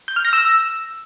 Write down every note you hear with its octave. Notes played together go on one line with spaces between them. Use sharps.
G6
F6
A#6
E6